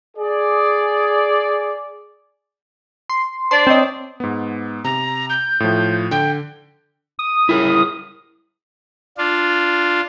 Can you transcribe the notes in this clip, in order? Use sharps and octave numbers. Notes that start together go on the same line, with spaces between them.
G#4 D5
C6
D4 C5 D5 C6
C4 C#5 D#5
G#2 B3
C3 A#5
G6
A2 F3
D3 G5
D#6
E4 G#4 A#4
D4 F4